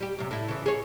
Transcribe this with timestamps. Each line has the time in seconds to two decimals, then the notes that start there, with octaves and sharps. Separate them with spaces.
0.01 G3 G4
0.19 F#2 C3
0.31 A2 E4
0.48 C#3 E3
0.66 G#4 C#5